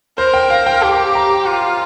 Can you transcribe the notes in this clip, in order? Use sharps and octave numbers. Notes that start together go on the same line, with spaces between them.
A#4 C5
G5
F5
G5
G4 G5
A#5
F4